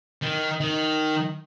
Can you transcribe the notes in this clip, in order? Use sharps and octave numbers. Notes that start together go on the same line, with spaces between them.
D#3
D#3